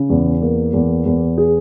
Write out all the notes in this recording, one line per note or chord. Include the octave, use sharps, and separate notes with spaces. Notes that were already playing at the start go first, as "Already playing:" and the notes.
Already playing: C#3
E2
A#3
E2
E2
G#4